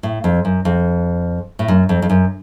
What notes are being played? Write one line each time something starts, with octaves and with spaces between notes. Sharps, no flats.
A2
F2
F#2
F2
A2
F#2
F2
F2
F#2